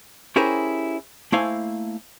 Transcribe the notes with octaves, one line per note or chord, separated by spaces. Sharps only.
C#4 E4 G4 G#4 A#4 C5
A3 A#3 E4 C5 F5 G#5